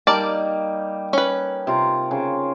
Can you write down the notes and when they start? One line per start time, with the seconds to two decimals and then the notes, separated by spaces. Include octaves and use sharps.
0.07 G3 A#3 D#4 A#4 D5 A5
1.13 C#4 B4
1.67 C3 F4 A#5
2.11 C#3